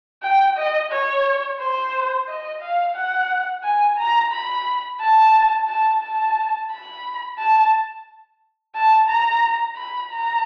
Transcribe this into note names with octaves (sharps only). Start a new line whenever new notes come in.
G5
D#5
C#5
C5
D#5
F5
F#5
G#5
A#5
B5
A5
A5
A5
B5
A5
A5
A#5
B5
A#5